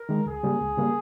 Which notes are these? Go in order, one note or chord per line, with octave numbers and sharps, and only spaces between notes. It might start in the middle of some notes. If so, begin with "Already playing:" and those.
Already playing: A#4
D#3 G#3
C#2 G#4
C#3 G3 A#3
C#2
C#3 G3 A#3